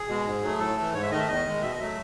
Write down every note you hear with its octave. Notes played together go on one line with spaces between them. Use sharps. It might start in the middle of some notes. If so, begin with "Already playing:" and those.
Already playing: G#4
B2 G#3
G#2
F#3 A3
A2 A4
E3 A3
G#2 C#5
E5
D#3 A3 D#5
E5
E2 D#5
D#3 G#3
B2 E5
D#5
F#3 A3 E5